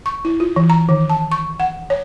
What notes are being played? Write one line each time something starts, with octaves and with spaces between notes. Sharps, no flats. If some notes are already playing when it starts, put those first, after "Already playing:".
C#6
E4
F4
E3
A#5
D#3
A5
C#6
F#5
C#5